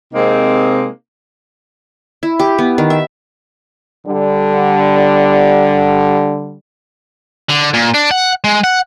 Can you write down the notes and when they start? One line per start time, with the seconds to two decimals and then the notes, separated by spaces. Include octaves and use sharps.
0.13 C3 G#3 A#3 C4 D#4
2.23 E4
2.39 G4
2.59 B3
2.78 D#3
2.90 E5
4.06 D3 G3
7.49 D3
7.73 A#2
7.94 D4
8.11 F#5
8.44 G#3
8.64 F#5